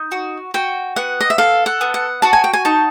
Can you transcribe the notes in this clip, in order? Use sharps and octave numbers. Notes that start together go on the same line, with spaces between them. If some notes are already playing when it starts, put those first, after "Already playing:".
Already playing: D#4
F#4
F#4 G5
B3 F#5
D#5
E5
A4 F5
F#5
B3
F#5
F#4 A5
G#5
G5
G#5
D#4 A5